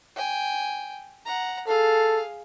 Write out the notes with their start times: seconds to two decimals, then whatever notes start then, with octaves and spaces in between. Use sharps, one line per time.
0.16 G5 G#5
1.26 F#5 A#5
1.68 G#4 A4 F5